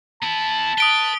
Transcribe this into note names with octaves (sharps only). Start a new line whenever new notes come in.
B3 E4 A5
B4 D#6 D7 G7